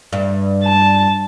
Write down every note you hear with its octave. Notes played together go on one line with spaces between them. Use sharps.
G2
A5